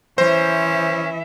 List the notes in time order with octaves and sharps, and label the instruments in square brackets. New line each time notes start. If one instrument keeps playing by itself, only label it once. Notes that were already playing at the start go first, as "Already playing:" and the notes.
[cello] E3 E5 [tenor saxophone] C#4 [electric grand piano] C5